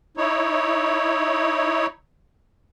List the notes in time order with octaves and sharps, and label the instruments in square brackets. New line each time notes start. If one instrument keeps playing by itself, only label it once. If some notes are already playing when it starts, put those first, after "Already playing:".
[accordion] D#4 E4 C#5